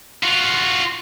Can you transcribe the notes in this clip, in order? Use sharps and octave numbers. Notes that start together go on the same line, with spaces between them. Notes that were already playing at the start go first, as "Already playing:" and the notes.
F4 F#4